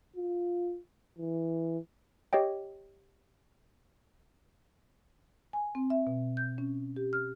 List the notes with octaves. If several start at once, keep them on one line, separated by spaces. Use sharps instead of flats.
F4
E3
G4 C#5 D#5 G5
G#5
C4
E5
B2
G6
C#4
G4
F6